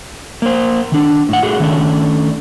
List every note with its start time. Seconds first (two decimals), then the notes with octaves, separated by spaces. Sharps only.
0.42 A#3 C5
0.92 D#3 D4
1.29 A2 F#5
1.42 A3 F#4 G#4
1.60 D#3 A3 C#4 D4